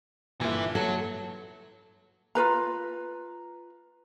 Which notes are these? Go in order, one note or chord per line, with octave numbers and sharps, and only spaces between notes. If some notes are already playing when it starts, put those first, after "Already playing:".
G1 A#2 E3 E4
F#3 A4
F4 G#4 B4 A#5